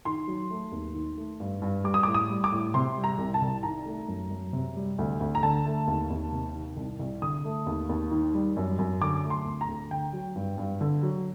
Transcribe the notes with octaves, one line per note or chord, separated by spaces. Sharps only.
D#3 C6
F#3
A3
D#2
D#3
A3
G2
G2
G3 D6
D#6
D6
A2
D#6
G3
D6
A2
C3 C6
G3
A#5
C2
A5
C2
D#3 A#5
A3
F#2
F#2
C3
G3
D2
D2
A#5
D3 A5
A3
D#2
D#2
C3
D#3
C2
C2
D3 D#6
A3
D#2
D#2
D#3
G3
F#2
F#2
D3 D6
A3
C6
D2
A#5
D2
D3 G5
F#3
G2
G2
D3
F#3